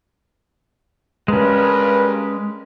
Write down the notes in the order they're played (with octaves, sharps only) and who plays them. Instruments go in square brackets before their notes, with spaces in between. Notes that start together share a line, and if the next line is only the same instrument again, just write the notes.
[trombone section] G2 A#4 B4 [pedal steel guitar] G#3 C#4